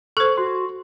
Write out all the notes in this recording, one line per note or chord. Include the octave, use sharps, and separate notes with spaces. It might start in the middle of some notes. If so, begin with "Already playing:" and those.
A4 C5 C#6 F#6
F#4 C6